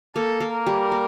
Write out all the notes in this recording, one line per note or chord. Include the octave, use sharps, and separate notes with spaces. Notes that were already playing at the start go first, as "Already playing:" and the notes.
A#3 A4
A#3
A#4
G3
A#3